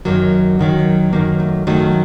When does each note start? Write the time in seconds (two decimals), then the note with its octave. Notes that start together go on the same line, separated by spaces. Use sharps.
0.05 F#2 D#3 F#3 A#3
0.59 F#2 D#3 F#3
1.13 F#2 D#3 F#3 A#3
1.40 A3
1.67 F#2 D#3 F#3 A3